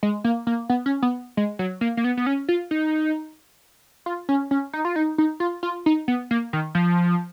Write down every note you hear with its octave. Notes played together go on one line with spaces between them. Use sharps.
G#3
A#3
A#3
B3
C#4
B3
G#3
F#3
A#3
A#3
B3
B3
C#4
F4
D#4
F4
C#4
C#4
D#4
F4
D#4
D#4
F4
F4
D#4
B3
A#3
D#3
F3